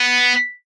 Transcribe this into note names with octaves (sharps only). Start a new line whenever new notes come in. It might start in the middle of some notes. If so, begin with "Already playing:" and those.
Already playing: B3